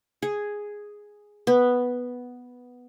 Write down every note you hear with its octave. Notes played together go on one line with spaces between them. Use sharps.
G#4
B3